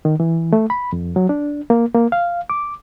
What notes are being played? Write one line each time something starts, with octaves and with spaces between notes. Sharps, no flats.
D#3
E3
A3
B5
F2
F#3
D4
A#3
A#3
F5
D6